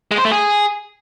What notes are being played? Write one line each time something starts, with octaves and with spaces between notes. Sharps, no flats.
G#3
C5
A3
G#4